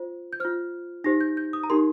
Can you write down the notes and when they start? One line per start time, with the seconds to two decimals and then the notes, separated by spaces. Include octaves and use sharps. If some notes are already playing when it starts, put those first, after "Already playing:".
Already playing: F4 C5
0.33 G6
0.40 F4 C5 F6
1.04 D#4 G4 C5 A#6
1.21 G6
1.37 G6
1.53 D#6
1.63 A#5
1.70 D#4 G4 A#4 C6